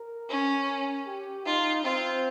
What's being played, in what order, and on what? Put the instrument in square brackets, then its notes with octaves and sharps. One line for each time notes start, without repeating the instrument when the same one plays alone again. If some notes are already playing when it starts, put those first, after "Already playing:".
Already playing: [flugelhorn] A#4
[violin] C#4
[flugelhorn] G4
[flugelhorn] D#4 [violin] F4
[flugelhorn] C4 [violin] F4